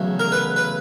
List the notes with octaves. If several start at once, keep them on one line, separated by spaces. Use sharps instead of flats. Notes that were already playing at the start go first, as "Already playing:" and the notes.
Already playing: E2 C#3 F#3 A3
A#4
B4
B4